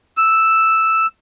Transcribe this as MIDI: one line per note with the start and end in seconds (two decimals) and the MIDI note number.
0.17 1.06 88